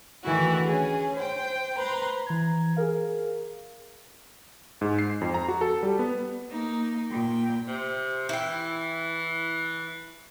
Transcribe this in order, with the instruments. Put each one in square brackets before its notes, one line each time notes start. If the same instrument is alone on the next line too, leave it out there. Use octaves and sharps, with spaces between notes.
[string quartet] D2 D#3 E3 A3 E4 F#4
C#4 G#4
C5 G5
B4 C5 A#5 C6
[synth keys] E3 A#5 G#6
G#4 A#4 F5
[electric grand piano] G#2
C7
F2
A#5
F#4
A4
G3
B3
[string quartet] A#3 D#4
A#2 G5
[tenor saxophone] C3
[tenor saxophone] E3 [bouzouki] E4 G5